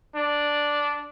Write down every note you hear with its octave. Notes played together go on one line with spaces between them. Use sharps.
D4